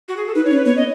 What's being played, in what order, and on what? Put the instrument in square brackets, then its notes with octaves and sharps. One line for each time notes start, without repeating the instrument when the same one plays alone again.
[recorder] F#4
G#4
A4
[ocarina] D#4 [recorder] B4
[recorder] C#5
[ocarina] C#4
[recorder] B4
[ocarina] B3 [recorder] C#5
[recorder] D#5